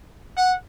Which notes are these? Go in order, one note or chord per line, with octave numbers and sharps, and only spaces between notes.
F#5